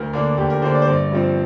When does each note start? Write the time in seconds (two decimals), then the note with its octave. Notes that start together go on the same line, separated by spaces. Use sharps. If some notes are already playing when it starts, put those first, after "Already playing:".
Already playing: D2 A#4
0.13 D3 A#3 D4
0.37 D2 G4
0.50 A#4
0.62 D3 A#3 D4 C5
0.75 D5
0.82 C5
0.87 G1 D5
1.11 G2 F3 C4